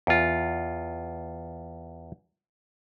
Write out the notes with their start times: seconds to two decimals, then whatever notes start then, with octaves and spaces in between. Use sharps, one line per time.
0.07 E2 F4